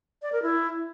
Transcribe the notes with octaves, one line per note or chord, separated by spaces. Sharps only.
D5
A#4
E4